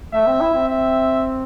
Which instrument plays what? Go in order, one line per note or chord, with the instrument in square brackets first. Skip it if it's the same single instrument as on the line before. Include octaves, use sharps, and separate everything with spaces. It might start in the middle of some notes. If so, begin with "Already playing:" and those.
[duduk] A3 [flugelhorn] E5
[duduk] C4
E4
C4
[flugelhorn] E5